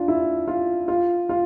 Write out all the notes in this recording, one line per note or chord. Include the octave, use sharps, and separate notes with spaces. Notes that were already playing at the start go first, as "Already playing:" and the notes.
Already playing: D4 F4
E4
F4
F4
F4